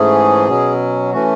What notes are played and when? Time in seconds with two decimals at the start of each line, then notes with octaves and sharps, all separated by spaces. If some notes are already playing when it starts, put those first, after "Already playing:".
Already playing: G#2 E3 A3 C#4 G#4
0.48 B2 F#3 C#4
1.13 E3 A3 C#4 F#4